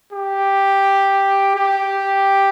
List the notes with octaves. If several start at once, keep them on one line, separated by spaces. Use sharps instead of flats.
G4
G4